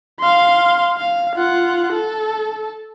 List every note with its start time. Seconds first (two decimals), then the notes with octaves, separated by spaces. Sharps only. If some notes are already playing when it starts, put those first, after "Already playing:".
0.20 F5 C6
0.97 F5
1.35 F4 F#5
1.92 A4